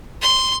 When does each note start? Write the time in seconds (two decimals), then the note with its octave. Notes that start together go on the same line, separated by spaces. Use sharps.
0.21 C6